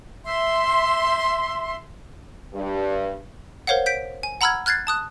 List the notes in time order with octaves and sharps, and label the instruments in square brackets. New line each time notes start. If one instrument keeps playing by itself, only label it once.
[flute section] E5 C6
[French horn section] G2
[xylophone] A#4 C5 C#5 F5 F#5
G6 B6 D7
G#5
F#5 A#5 B5 E6 F6 G#6
F6 F#6 G#6 A6 C7
A5 D#6 F#6